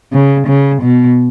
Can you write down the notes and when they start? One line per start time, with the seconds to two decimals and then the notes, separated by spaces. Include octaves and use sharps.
0.13 C#3
0.47 C#3
0.82 B2